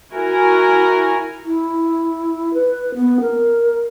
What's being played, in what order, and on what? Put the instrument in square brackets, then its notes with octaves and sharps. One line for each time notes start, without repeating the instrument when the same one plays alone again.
[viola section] E4 F#4 A#4 G#5
[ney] E4
B4
B3
A#4